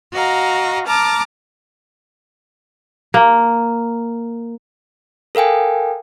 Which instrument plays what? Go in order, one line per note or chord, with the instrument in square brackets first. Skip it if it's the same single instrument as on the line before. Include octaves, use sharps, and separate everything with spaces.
[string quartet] F#4 D#5 F5 A#5
A5 A#5 D6 F6
[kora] A#3
[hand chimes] A4 A#4 F5 G5 G#5